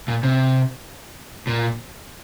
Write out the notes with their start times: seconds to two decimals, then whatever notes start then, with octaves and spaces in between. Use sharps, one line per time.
0.08 A#2
0.23 C3
1.47 A#2